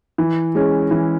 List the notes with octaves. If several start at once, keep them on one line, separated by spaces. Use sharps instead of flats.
E3
G#3 C#4
E3